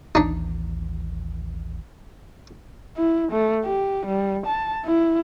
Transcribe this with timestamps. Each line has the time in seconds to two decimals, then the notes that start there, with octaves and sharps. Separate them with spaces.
0.15 A1 D#2 E3 D4 D#4
2.97 E4
3.32 A3
3.65 G4
4.06 G3
4.46 A5
4.85 E4